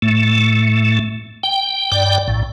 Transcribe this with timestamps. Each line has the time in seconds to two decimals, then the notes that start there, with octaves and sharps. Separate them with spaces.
0.02 A2 A3
1.43 G5
1.92 G2 D5 G5
2.28 A#1 A2